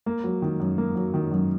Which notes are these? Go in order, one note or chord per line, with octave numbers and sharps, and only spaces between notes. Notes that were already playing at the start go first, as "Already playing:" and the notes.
A#3
F#3
D#3
F#2
A#3
F#3
D#3
F#2